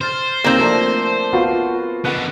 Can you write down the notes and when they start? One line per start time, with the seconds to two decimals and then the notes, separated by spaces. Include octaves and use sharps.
0.01 C5 F6 A6
0.44 D#2 A#3 C4
0.59 F3 A3 D4
1.33 B3 F4 F#4
2.05 B2 D3 F#5 F#6